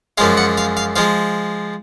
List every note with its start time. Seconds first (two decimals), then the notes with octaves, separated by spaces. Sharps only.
0.18 F#2 F3 G#3 F5
0.37 F#5
0.58 F5
0.77 F5
0.96 F3 G#3 F5